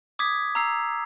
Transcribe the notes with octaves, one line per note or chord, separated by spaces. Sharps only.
D6 D#6 G#6 B6
A#5 E6 C7